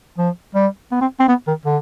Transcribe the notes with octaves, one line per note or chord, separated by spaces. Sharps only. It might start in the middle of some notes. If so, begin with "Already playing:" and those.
F3
G3
B3
C4
C4
B3
D#3
D3